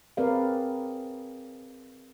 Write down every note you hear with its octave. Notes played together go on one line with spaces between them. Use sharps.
C4 G#4 A#4 B4 D5 F5